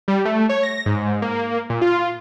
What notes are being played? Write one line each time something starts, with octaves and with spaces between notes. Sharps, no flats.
G3
A3
C#5
A#6
G#2
A#3
A#2
F4